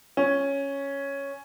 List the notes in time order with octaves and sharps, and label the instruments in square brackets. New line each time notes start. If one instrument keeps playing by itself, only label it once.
[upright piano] C#4